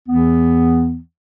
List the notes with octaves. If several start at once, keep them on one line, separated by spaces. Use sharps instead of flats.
E2 E3 B3